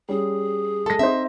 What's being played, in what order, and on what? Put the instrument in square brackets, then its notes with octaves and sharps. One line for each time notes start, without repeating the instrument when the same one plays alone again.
[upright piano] G3 C#4 [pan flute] G#4
[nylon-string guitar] G#3 A4 [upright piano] A5 A#6
[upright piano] C4 D#4 C5 [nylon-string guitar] E5